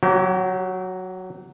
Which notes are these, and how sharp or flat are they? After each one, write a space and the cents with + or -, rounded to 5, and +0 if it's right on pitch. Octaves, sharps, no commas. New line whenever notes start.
F#3 +0 G4 -35